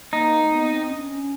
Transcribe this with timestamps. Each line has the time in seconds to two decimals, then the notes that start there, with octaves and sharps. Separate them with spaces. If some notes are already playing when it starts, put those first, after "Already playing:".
0.13 A#3 D#4
0.44 A#3
0.50 B3
0.71 C4
0.89 C#4
0.97 D4
1.04 C#4